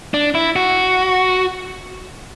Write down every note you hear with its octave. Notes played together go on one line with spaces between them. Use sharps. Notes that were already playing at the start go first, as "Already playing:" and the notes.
D4
E4
F#4